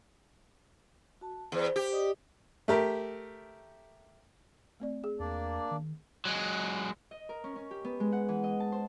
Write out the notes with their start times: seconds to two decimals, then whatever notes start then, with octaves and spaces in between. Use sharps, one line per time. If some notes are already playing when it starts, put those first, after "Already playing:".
1.21 F#4 A5
1.52 E2 C5
1.76 G4
1.92 D5 D#5 D#6
2.68 A3 G4 A#4
4.80 A3 C4 D5
5.04 G#4
5.20 E2 A#3 D4 D5
5.71 D#3
6.25 F#3 G#3
7.11 D#5
7.29 A#4
7.44 C#4
7.56 C#4
7.71 G4
7.84 B3
8.00 G#3
8.12 F#5
8.28 E3
8.44 D#5
8.60 A5
8.72 C5